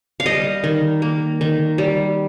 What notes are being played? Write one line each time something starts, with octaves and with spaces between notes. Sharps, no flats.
F5
G3 D#5
D#3
A#3
D#3
G3